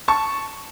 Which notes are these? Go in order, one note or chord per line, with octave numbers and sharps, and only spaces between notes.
A5 C#6